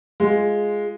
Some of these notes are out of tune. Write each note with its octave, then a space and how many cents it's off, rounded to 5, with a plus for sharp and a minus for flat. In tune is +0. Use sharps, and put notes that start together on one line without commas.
G#3 +0 F4 +0 G#4 +0